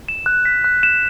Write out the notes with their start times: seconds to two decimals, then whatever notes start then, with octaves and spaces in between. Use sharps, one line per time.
0.08 E7
0.26 F#6
0.45 B6
0.64 F#6
0.83 E7